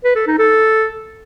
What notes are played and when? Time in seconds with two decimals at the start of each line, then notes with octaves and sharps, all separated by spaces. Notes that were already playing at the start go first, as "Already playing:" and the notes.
0.04 B4
0.16 A4
0.27 D#4
0.38 A4